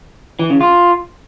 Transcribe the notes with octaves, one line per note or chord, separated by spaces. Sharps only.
E3
C#3
F4